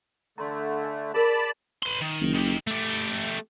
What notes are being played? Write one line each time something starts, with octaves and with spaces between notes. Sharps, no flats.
D3 A3 A#5 C6
D#5 G#5
G#4 A#4 C#5 D5 A5 B5
B4 C6
D#3
F#1
D#3 G4
A3 G4